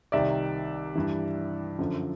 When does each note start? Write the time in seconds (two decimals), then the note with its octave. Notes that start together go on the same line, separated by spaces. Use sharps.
0.12 C2 C3 D#3 D5 E5
0.95 G2 E3
1.79 F#2 D3 F3